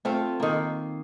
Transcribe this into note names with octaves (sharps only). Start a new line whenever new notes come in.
A3 C4 F4
D#3 A#3